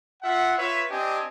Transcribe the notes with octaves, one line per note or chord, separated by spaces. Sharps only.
F4 E5 F#5
F4 B4 C#5 E5
C4 D4 G4 D#5 G#5